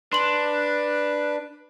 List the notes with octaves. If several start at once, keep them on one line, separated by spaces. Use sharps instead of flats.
D4 B4 C6 F#7